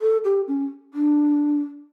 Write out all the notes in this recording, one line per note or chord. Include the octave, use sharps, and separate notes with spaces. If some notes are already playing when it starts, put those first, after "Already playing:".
A4
G4
C#4
D4